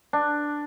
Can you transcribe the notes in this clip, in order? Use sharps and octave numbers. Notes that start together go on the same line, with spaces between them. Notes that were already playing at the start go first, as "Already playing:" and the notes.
D4